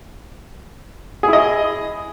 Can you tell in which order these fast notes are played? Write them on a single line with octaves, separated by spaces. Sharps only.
G#4 E4 D#5